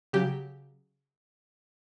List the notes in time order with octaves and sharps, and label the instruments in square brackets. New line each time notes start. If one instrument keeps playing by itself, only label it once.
[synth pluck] C#3 F#3 G4